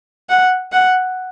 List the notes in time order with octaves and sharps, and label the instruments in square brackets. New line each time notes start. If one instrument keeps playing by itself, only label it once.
[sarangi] F#5
F#5